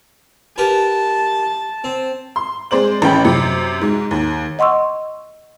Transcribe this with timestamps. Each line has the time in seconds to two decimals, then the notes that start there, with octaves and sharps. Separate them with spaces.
0.58 G4 A#4 B4 A5
1.84 C4
2.36 C6
2.71 G#3 C4 C5 D5 F#7
3.02 A1 C#4 G5 B5
3.25 F#2 C3 C#7
3.81 G#2
4.11 D#2
4.59 D#5 F#5 C6 C#6 E6